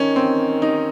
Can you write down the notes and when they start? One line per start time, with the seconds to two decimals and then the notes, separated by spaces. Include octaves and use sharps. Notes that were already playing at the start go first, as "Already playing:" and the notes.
Already playing: D#3 C#4
0.16 C4
0.62 D#4